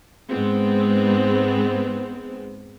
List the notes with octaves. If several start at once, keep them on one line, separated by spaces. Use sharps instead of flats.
G#2 G#3 B3 C4